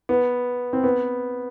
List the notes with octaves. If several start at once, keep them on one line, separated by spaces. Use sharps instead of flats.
B3
C4
B3